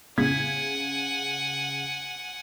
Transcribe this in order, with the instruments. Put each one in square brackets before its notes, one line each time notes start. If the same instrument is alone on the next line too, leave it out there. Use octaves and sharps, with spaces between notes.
[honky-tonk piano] C#3 G#6 B6 [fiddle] F#5 G#5